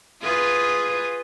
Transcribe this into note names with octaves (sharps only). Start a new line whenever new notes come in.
F4 G#4 B4